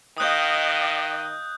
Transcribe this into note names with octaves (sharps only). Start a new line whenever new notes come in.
D#3 D#5 F5 G5 D#6 F#6 G6